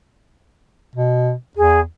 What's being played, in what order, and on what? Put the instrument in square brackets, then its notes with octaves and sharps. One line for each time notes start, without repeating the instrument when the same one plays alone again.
[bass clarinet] B2
[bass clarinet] E2 [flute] G#4